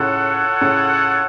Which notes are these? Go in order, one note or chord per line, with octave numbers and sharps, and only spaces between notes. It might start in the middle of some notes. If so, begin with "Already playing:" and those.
Already playing: A2 C#3 F4 A4 C#5 F#5
A2 C#3